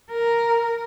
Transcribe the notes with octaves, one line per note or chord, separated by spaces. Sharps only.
A#4